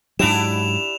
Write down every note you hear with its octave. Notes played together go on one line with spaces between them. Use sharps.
G#2 F#3 D4 E4 G4 E7 F7